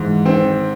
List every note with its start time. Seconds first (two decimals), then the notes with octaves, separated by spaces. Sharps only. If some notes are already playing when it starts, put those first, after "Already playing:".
Already playing: G#2 E3
0.25 D#3 C4